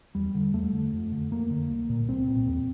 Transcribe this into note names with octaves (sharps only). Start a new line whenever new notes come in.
E2 G3
D3
E2 A3
D3
F2
D3
F2 A#3
D3
C2
A#2
C2 C4
A#2
E2